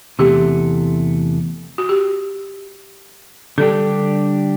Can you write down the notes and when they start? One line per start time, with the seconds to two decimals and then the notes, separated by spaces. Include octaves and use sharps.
0.19 E2 C3 E3 A3 G4
1.78 F#4
1.89 G4
3.58 D3 G3 D4 G4 A4